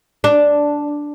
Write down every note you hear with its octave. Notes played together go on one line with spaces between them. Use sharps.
D4